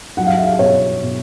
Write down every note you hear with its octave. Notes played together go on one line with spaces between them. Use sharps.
F#3 F#5
F5
E5
F5
B2 C#5
B2